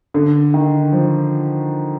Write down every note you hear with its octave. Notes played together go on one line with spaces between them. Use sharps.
D3
D#3
F3